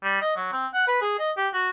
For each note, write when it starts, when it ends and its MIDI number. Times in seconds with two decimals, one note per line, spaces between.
0.04 0.21 55
0.22 0.31 75
0.36 0.52 54
0.53 0.67 60
0.74 0.85 78
0.88 1.00 71
1.01 1.14 68
1.19 1.31 75
1.37 1.48 67
1.53 1.70 66